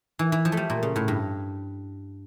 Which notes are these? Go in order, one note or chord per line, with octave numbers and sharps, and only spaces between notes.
E3
E3
F3
A3
G3
A#2
C#3
A2
G2